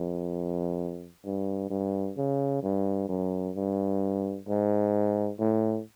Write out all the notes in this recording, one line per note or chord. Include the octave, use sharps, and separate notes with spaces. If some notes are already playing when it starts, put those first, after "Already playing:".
Already playing: F2
G2
G2
C#3
G2
F#2
G2
G#2
A2